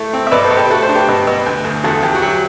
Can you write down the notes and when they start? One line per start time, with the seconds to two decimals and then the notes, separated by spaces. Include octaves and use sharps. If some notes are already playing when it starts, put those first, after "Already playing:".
Already playing: A2 A3
0.13 C4
0.27 E5
0.31 B2 B4 D5
0.44 A4 C5
0.51 B2
0.57 G4 B4
0.70 A3 F#4 A4
0.82 A4 C5
0.89 D4
0.95 G4 B4
1.09 B2
1.27 B2
1.46 D2
1.64 D2
1.84 E2 F#4 A4
2.03 E2 G4
2.15 F#4
2.22 F#3 G4